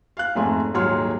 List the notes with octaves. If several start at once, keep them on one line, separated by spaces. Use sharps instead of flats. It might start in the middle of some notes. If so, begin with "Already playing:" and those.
F5 F#6
F#1 F2 G#2 A3 G#5
D#1 G#2 F#3 C#5 C6 F6